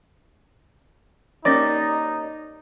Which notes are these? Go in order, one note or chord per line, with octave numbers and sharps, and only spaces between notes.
A#3 C#4 D#4 G4 D5 D6 A6 A#6